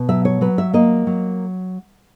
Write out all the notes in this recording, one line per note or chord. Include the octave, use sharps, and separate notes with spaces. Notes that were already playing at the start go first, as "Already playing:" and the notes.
Already playing: B2
F#3 E5
C#5
F#3 B4
E5
A#3 D#5
F#3